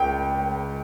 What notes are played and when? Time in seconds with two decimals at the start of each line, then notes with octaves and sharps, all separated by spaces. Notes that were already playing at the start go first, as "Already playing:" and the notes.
Already playing: C#2 G5